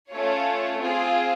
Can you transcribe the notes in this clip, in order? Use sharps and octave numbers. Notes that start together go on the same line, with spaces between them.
A3 C#4 F4 C#5
C4 F4 G#4